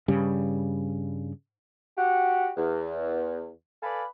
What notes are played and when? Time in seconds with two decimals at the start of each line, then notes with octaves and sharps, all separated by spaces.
0.08 G2 C#3 G3
1.98 F#4 G4 F#5
2.57 E2
3.83 A4 B4 D5 F5 G#5 B5